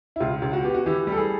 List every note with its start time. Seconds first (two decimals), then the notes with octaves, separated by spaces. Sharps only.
0.16 E4
0.20 C#2 F4
0.42 C#2
0.53 F#4
0.64 B3 G4
0.74 F#4
0.86 E3 G4
1.07 G3 A4
1.17 G#4